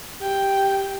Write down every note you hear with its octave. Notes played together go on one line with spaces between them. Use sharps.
G4 G5